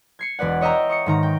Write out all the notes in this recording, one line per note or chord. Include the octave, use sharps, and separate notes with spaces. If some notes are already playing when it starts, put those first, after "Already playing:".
G#6 C7 C#7
E1 B4 D5 F#5
C#5 D#5 E5 G5 A#5
C#6 D#6 C#7
G#2 D#3 A#5
G5